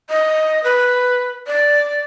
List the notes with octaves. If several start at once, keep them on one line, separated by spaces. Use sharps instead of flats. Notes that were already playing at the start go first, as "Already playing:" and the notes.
D#5
B4
D5